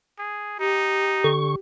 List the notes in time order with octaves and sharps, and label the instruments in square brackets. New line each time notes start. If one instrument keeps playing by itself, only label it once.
[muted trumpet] G#4
[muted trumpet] D#4 [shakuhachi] G4
[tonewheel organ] D3 C#6